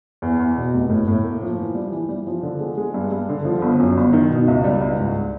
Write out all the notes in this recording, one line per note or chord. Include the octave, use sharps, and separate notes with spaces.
E2
E2
B2
F1
A2
A2
A#3
F3
E3
G3
E3
G3
F3
D3
G#3
G#3
G2
G2
D3
F3
G1
F#2
G1
D#3
B2
C#2
G3
C#2
G#2